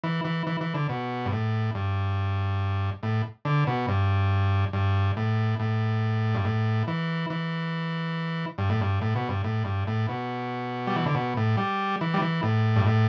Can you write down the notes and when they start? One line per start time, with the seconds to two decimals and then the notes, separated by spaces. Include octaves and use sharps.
0.04 E3
0.25 E3
0.47 E3
0.61 E3
0.74 D3
0.89 B2
1.25 G2
1.32 A2
1.75 G2
3.03 A2
3.45 D3
3.67 B2
3.88 G2
4.73 G2
5.17 A2
5.60 A2
6.35 G2
6.45 A2
6.88 E3
7.30 E3
8.58 G2
8.70 A2
8.81 G2
9.01 A2
9.16 B2
9.29 G2
9.44 A2
9.65 G2
9.87 A2
10.09 B2
10.87 G3
10.96 E3
11.06 D3
11.15 B2
11.37 A2
11.57 G3
12.01 E3
12.14 G3
12.22 E3
12.43 A2
12.76 G2
12.86 A2